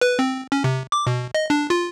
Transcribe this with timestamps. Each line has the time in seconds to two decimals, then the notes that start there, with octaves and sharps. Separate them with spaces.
0.01 B4
0.19 C4
0.52 C#4
0.64 C3
0.92 D6
1.07 B2
1.35 D#5
1.50 D4
1.70 F4